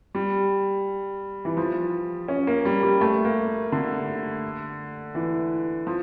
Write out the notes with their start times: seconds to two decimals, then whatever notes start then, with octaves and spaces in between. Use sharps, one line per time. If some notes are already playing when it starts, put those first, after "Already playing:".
0.15 G3
1.45 E3
1.57 F3
2.28 C#4
2.47 A#3
2.65 G3
2.83 G3
3.01 A3
3.25 A#3
3.72 D3
5.15 E3
5.87 F3